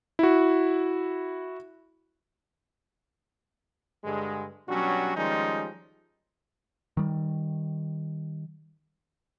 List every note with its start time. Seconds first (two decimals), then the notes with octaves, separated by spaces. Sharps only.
0.19 E4 F#4
4.04 G2 D3 G#3
4.69 B2 F#3 G3 C#4 D4 F#4
5.17 D#3 F3 G3 G#3 C#4 D#4
6.97 D#3 G3